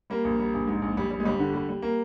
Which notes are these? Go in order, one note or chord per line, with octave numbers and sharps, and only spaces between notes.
G3 A#3
A#1
G3
A#1
G#2
A#1
A#1 G3
G3
G#3
G1 G3
D3
G3
G3
A#3